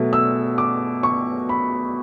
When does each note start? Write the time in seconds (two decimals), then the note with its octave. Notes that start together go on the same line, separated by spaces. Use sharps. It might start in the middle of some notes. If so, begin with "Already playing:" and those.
Already playing: B2 F#3 A3
0.13 E6
0.58 D6
1.03 C#6
1.49 B5